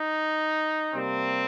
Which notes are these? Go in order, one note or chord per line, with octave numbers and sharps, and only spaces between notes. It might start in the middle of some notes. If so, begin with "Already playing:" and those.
Already playing: D#4
C3 G3 A#3 C4